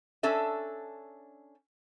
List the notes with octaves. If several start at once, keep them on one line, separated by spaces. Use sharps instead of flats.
C#4 D4 A4 E5